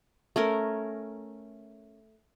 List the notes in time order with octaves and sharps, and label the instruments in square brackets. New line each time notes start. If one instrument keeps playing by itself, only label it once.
[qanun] A3 C#4 A#4